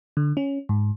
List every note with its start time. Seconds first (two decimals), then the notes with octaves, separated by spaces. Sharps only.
0.17 D3
0.37 C#4
0.69 G#2